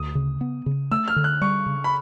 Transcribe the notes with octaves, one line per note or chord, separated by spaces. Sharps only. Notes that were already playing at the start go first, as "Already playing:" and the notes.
Already playing: D2 D#6
C#3
B3
C#3
A3 E6
F6
D3
F#6
G3 C#6
C#3
B5